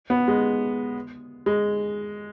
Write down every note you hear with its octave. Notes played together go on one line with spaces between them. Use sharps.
B3
G#3
G#3